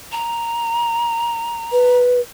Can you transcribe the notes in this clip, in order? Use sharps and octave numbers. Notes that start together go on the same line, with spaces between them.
A#5
B4